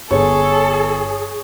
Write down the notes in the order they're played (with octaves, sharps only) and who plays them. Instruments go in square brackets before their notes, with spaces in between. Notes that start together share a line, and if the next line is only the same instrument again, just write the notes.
[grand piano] G1 [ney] G#4 [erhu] A4 [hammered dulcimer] C#5 A5